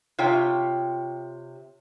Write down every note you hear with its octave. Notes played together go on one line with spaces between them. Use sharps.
C3 F4 C#5 G5